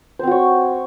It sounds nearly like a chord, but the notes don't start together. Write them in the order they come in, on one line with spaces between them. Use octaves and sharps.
C5 C4 F#4 C#5